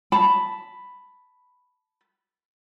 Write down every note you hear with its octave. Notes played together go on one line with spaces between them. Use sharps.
A5 B5